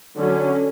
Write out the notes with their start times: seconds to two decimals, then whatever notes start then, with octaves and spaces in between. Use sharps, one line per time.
0.17 D3 F#3 C#4